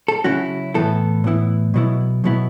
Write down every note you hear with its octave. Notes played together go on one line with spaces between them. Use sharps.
A4
C#3 F#3 C#4 E4 F#4
A2 E3 B3 E4 A4
A2 E3 B3 E4
B2 F#3 B3 E4
B2 F#3 B3 E4